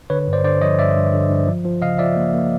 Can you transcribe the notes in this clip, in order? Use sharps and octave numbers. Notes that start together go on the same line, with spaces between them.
D3 B4 C#5
G2
C5 D5
D3 C5 D5
F3 C#5 D#5
G2 D5 E5
G2
D3
G2
F3
F3
C#3 D#5 F5
F3 D5 E5
A#3
A#3